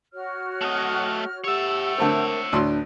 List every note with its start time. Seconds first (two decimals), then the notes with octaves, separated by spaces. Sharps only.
0.13 F#4 C#5 F6
0.61 A3 D#5
1.44 G4 C#5 E5 F#5 E6
1.98 D3 A3 C4 A#4
2.52 D2 A2 D4 B4 C6